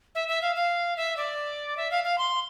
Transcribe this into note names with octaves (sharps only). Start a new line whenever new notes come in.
E5
E5
F5
F5
E5
D5
E5
F5
F5
C6